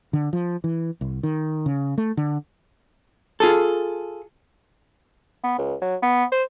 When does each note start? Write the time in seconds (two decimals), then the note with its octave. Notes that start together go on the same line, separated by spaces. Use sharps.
0.13 D3
0.33 F3
0.64 E3
1.01 C2
1.23 D#3
1.66 C#3
1.98 A3
2.17 D3
3.40 F4 G#4 A4
5.43 B3
5.58 C#2
5.81 F#3
6.02 B3
6.32 C5